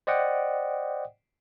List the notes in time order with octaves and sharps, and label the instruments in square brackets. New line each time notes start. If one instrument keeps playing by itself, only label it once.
[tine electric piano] C5 D5 D#5 F#5 G5